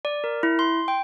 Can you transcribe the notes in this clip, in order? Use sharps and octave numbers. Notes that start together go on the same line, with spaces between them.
D5
A#4
E4
C6
G5